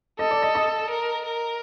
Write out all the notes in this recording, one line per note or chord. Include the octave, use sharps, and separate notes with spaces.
A4 D#5
D5
D#5
D#5
A#4
A#4